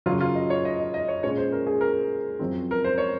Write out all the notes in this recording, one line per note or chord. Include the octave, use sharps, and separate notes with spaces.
F#2 C#3 F#3 F4
F4
D#5
C#5
D#5
D#5
D#5
C#5
A#2 G#3 C#4 C#5
C5
A#4
G#4
A#4
F#2 F3 C4
A#4
C5
C#5